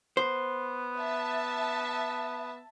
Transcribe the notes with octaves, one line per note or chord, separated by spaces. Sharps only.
B3 C5
E5 A5